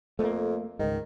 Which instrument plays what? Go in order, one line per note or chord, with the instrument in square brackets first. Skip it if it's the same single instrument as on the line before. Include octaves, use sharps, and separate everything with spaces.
[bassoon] F2 [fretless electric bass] A3 A#3
[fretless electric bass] C#2 G#2 [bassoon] D#3